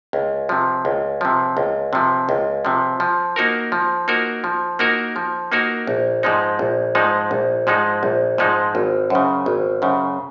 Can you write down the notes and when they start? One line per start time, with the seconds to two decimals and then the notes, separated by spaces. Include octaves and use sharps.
0.13 C#2
0.49 C3 F3
0.85 C#2
1.21 C3 F3
1.57 C#2
1.93 C3 F3
2.29 C#2
2.65 C3 F3
3.00 F3
3.36 A#3 D#4 F#4 A#4
3.72 F3
4.08 A#3 D#4 F#4 A#4
4.44 F3
4.79 A#3 D#4 F#4 A#4
5.16 F3
5.52 A#3 D#4 F#4 A#4
5.87 A#1
6.23 G#2 F3 G#3 D#4
6.59 A#1
6.95 G#2 F3 G#3 D#4
7.31 A#1
7.67 G#2 F3 G#3 D#4
8.03 A#1
8.38 G#2 F3 G#3 D#4
8.75 G#1
9.10 F#2 C#3
9.46 G#1
9.82 F#2 C#3